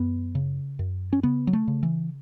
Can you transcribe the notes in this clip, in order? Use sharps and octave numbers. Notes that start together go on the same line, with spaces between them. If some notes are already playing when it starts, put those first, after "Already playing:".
Already playing: F#2 B3
C#3
F#2
C#4
C#3 B3
F#3
A3
C#3
E3